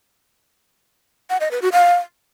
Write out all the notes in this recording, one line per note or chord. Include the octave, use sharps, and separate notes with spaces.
F#5
D#5
B4
F#4
F5